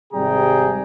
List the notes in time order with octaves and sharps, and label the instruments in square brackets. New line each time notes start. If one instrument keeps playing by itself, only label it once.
[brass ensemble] G#1 C3 G3 G#4 G5 A#5